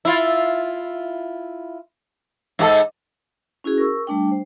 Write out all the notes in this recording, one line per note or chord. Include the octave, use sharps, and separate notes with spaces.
E4 F4
G#2 F#4 A4
C#4 E4 F#4 G#4
A#4 C#6 E6
G3 A3 D4 G5
C5